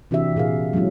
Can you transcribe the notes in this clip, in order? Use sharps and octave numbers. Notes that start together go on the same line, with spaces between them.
C3 E3 D4 F#4 G4 E5
A#2 G#4 A#4 F5
F#3 G#3 B3 C#4 E4